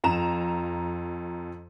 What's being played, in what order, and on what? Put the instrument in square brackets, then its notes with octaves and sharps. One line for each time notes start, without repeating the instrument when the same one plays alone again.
[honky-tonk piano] F2 A#5 E7